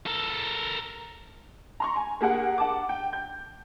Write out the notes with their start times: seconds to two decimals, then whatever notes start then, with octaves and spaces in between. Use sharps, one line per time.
0.06 A4 A#4
1.80 A#5 C6 C#6
1.96 G#5
2.21 A#3 G4 G#4 A#4 F#5
2.58 F#5 A5 D6
2.89 G5
3.13 G6